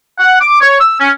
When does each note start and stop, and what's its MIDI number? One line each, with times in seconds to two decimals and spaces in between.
0.19 0.38 78
0.41 0.61 86
0.61 0.77 73
0.80 0.99 88
1.00 1.10 61